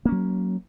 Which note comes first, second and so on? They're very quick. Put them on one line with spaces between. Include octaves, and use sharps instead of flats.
A#3 C#4 F#3